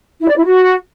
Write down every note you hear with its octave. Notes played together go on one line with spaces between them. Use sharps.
E4
D5
E4
F#4